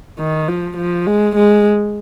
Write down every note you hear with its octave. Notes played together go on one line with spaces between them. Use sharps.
D#3
F3
F3
G#3
G#3